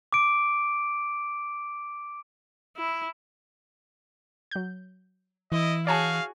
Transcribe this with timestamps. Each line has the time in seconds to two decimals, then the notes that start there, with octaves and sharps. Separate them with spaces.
0.13 D6 D7
2.77 E4
4.51 F#3 G6
5.52 E3 E4 D#5
5.87 F#4 G#4 C#5 F5 G#5 A5